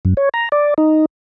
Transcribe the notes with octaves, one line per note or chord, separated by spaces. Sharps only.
F#2
C#5
A#5
D5
D#4